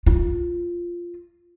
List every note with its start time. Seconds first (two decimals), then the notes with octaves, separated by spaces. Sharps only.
0.06 F4